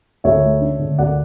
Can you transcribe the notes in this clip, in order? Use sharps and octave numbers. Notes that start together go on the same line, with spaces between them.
D2 C#5 E5
A3
D4
D3
D2 D5 F#5